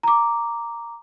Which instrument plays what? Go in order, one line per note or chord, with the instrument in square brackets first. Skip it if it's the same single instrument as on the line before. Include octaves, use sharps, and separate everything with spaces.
[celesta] A#5 D6